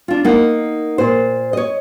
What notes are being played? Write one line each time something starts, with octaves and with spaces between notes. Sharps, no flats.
D4 F4
A#3 D#4 F#5
A#2 C5
C#5 D#5